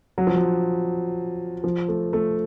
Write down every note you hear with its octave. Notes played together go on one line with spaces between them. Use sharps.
F#3
F3
F#3
F3
A3
A3